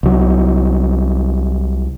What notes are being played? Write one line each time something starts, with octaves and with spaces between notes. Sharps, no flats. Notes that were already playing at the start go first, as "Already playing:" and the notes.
C2 F#3